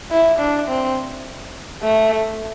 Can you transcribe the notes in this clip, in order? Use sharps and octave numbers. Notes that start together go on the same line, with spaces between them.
E4
D4
C4
A3